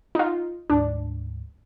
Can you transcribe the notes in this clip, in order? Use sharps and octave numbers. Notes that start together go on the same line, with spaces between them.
D#4 F4
D2 G#2 D4